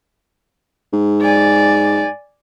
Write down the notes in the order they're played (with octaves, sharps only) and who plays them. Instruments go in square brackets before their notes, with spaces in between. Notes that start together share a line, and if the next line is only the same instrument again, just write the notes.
[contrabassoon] G#2
[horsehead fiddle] D5 G#5